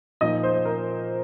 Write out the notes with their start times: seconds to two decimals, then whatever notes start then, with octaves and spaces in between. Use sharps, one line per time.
0.21 A#2 F3 D#4 D#5
0.43 C5
0.54 C5
0.65 A#4